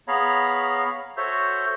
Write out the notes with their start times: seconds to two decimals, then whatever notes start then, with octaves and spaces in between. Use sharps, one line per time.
0.08 B3 G#4 C#5 F5 A#5 B5
1.17 F#4 A4 C5 C#5 E5